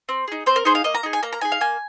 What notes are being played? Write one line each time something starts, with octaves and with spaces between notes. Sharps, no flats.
C4
D#4 G#4
C4 C5
A#4
D#4 G#4 C5
F5
A#3 D#5
A#5
D#4 G#4
G#5
A#3 A#5
A#5
D#4 G#4 G#5
F5
A#3 G#5